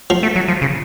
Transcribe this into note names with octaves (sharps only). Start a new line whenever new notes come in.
F3
A3
F#3
F3
C#3